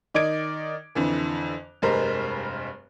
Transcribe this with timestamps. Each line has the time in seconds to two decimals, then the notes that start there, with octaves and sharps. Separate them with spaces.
0.14 D#3 D5 D#5 G#6 D7
0.95 F2 D3 E3
1.82 F1 G2 G3 G#3 A#4 C5